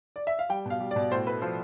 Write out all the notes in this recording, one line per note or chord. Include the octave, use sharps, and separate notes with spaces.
D5
E5
F5
G3 G5
B2 F5
G3
D5
B2
A2 C5
A3 B4
F3 C5